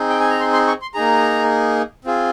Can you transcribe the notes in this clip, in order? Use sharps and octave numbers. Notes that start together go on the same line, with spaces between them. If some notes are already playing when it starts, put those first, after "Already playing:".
Already playing: C4 D#4 G#4
G5
G#5
A#5
C6
C6
C#6
C6
A#3 D#4 G#4 A#5
C4 F4 G#4